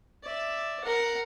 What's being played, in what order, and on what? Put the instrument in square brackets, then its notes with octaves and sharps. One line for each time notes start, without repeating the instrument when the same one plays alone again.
[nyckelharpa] D5 E5
A#4 F#5